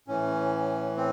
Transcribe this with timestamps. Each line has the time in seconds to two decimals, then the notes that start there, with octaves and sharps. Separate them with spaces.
0.08 A2 E3 C#4
0.97 C4